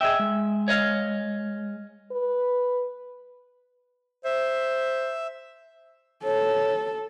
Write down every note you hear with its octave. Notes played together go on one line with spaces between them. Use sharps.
G#4 D#5 E5 G5
G#3
C#5 D#5 F5
B4
C5 E5
A4 C#5